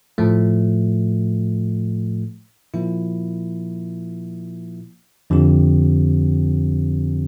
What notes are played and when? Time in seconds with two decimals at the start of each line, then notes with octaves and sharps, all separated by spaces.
0.18 A2 F3 A3
2.74 A#2 F3 A#3 E4
5.30 F2 D3 F3 C4 G4